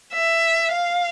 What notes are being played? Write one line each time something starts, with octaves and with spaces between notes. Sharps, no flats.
E5
F5